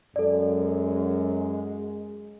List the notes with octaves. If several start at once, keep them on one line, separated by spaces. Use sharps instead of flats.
F#2 G#3 A4 D5